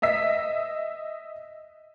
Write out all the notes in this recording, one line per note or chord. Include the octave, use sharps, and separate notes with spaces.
D#5 E5 E6 B6